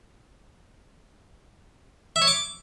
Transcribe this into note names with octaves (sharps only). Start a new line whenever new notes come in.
E5
C#5
D6